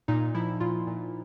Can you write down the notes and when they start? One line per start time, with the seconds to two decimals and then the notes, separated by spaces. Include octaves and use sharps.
0.08 A#2 D#4
0.34 F3 E4
0.60 A#2 F4
0.87 A#2